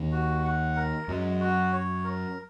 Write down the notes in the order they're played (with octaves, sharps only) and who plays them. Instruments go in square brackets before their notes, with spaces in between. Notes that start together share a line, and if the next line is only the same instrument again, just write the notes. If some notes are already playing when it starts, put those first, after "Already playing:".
Already playing: [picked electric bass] D#2 D#3
[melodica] F#4
F#5
A#4
[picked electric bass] F#2 F#3 [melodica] G#3
[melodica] F#4
C#5
A#4